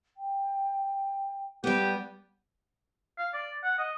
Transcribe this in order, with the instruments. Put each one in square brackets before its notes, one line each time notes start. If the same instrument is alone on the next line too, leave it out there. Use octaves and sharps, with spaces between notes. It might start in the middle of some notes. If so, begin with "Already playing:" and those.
[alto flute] G5
[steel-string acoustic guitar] G3 B3 [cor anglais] G4
[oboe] F5
D5
F#5
D#5